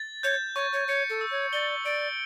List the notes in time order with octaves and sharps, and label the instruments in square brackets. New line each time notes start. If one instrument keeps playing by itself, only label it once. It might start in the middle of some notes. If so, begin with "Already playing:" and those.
Already playing: [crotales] A6
[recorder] C#5 [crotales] G6
[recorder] C#5 [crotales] C#6
[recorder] C#5
[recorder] C#5 [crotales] C#7
[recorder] A4
[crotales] E6
[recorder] C#5
[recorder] D5 [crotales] G7
[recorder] D5 [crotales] D7